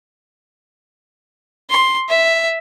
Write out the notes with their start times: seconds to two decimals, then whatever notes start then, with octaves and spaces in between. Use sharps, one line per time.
1.70 C6
2.09 E5